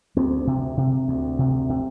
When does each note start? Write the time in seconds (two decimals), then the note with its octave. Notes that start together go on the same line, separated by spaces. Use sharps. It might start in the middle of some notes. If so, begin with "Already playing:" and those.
0.17 D2 C4
0.47 C3
0.77 C3
1.08 D2
1.39 C3
1.69 C3